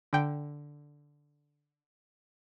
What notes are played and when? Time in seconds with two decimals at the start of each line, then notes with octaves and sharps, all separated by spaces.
0.13 D3 G5